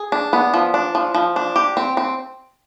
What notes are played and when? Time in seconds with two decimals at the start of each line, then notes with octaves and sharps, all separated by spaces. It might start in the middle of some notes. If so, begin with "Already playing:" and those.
Already playing: G#4
0.12 D4
0.33 B3
0.54 F3
0.74 D4
0.95 F3
1.14 F3
1.36 D4
1.56 G4
1.77 C4
1.97 C4